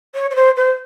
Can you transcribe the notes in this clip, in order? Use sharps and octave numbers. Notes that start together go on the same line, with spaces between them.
C#5
C#5
C5
C5